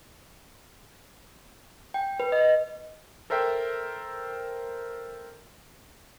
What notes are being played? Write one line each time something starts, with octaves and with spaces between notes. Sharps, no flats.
G5
B4
D#5
A4 A#4 C5 E5 G5